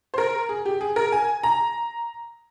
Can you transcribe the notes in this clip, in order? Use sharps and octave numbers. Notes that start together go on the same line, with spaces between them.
C5
A#4
G#4
G4
G#4
A#4
G#5
A#5